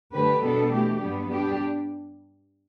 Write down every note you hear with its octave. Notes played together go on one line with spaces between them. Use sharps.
D3 A3 G4 B4
B2 G3 B3 D4 A4
E3 A3 G4
G2 G3 B3 D4
G3 D4 G4